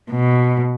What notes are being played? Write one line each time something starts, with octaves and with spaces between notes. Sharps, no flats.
B2